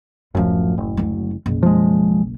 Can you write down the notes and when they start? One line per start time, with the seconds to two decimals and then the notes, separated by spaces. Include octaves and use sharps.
0.35 D1 A1 F#2 F3
0.78 F#1
0.97 D2 F#3
1.46 F#1 B1
1.63 F3 G#3